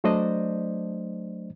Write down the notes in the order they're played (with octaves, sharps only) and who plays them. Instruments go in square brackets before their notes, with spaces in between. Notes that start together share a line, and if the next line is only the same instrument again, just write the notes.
[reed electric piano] F#3 A3 D4 C5 D5 D#5